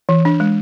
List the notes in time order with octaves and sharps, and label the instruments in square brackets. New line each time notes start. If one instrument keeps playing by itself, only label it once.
[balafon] E3
D4
G#3